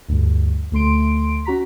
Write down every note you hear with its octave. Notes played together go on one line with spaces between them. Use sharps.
D2 G2
D2 A3 C6 D7
C#4 F#4 A#5 B6